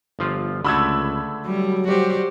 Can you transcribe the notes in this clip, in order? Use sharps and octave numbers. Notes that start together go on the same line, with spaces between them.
G1 F3 F4
C#2 D3 A3 B5 E6 G#6
F#3 G3
G3 F#4 G4 C5